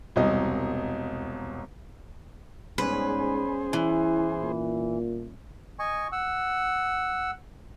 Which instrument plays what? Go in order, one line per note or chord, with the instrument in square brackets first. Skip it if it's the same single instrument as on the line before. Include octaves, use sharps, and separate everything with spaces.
[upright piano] E1 C2 D#5
[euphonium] G#2 [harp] G3 B3 C#4 [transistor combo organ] G#4 C5 [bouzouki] B4
[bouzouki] E3 [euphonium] E4
[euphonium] A#2
[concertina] D#5 G#5 C#6
F#5 E6